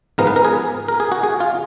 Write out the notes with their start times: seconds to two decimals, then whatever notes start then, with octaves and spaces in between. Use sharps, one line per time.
0.18 G#2 F3 G#3 B3 A#4
0.27 B4
0.36 A#4
0.45 G#4
0.88 A#4
1.00 G#4
1.12 F#4
1.23 G#4
1.40 F4